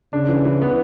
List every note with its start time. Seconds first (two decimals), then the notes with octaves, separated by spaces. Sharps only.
0.13 C#3 D4
0.29 E3
0.45 E3
0.62 B3